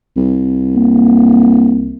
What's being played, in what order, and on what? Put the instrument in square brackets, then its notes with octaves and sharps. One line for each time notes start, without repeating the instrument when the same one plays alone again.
[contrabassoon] C2
[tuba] A#3